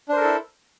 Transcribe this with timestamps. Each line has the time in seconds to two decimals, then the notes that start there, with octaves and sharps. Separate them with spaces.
0.09 D4
0.13 C5
0.17 A#4
0.20 A4
0.24 E4